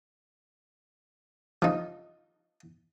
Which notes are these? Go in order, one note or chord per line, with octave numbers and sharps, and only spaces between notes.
F3 D#4